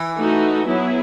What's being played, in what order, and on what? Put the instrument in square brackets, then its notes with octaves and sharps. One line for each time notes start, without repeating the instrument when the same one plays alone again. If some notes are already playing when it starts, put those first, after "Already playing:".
Already playing: [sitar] E3
[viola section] A3 D#4 F#4
F#3 B3 E4 G#4